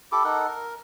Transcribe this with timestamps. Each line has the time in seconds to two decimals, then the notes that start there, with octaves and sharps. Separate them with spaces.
0.12 E4 G4 A4 D6
0.24 D#4 A4 A#4 F#5
0.47 A#4